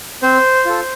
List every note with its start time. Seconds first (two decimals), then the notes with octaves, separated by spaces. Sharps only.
0.22 C4 C5
0.65 F4 A4